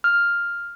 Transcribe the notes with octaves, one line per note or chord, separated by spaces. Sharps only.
F6